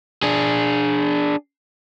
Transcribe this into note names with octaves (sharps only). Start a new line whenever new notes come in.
D4 G#4